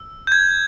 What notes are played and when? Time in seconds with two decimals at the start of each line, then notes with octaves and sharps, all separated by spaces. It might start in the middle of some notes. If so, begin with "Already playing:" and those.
Already playing: E6
0.27 G6
0.32 G#6